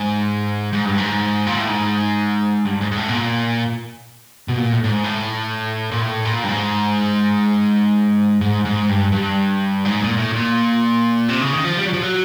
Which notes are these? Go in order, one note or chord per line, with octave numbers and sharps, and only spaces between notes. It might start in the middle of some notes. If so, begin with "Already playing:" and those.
Already playing: G#2
G#2
G2
G#2
A#2
A2
G#2
G2
G#2
G#2
A2
B2
A#2
B2
A#2
A2
A2
G#2
A2
A#2
A2
A#2
G2
G#2
G#2
G#2
G2
G2
G#2
A#2
A2
A#2
C3
C#3
D#3
F3
G3
F#3
F3
F#3